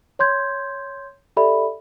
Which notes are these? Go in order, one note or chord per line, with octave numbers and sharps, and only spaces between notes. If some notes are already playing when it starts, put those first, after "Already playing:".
C#5 C6 G6 G#6
G4 A4 D5 E5 B5